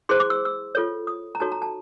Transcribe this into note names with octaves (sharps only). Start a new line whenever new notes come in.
E4 G#4 C5 C6
D6
E6
E6
F4 A4 C#5
D#6
A#5
D#4 F#4 A4 C#5 A5
A#5
A5